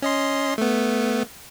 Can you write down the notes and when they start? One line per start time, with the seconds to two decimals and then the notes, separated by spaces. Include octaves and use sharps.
0.02 C#4 D#5 C6
0.58 A3 B3